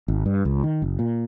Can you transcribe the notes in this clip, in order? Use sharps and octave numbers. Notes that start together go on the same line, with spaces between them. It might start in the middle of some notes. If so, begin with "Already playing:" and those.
G#1
G2
C#2
D#3
F#1
A#2